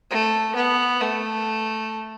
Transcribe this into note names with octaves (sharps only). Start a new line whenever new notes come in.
A3
B3
A3